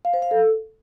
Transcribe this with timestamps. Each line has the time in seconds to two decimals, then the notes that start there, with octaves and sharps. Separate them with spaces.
0.05 F5
0.14 C5
0.22 F5
0.31 A4